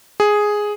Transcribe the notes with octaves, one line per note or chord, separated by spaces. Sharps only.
G#4